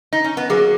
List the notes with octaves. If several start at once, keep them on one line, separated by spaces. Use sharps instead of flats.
D#4
C#4
B3
F#3 A#3 G#4